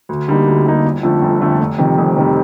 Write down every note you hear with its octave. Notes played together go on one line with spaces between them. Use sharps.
D2
D3 G3 A#3 D#4
D2
D3 G3 A#3 D#4
G1
F2 D3 F3 A3
G1
F2 D3 F3 A3
F1
F2 C3 D#3 G3
F1
F2 C3 D#3 G3